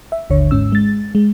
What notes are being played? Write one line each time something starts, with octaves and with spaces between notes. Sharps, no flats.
E5
G#1 D#2 D3 C#5
G#2 C#4 E6
G#3 A6
G#3